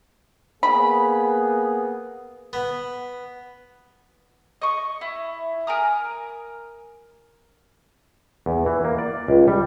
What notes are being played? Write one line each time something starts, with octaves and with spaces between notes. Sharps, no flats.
A#3 B3 G#4 B5
B3
D#5 C#6
E4
A#4 G#5 A#5 D#6
E2
E3
A#3
D5
C#2
G3